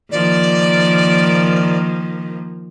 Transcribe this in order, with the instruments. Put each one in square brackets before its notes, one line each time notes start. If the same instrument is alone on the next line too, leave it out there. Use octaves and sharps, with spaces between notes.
[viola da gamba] D#3 F3 A#3 [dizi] D5